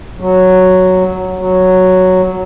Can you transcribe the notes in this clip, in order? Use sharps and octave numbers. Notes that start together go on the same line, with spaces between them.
F#3
F#3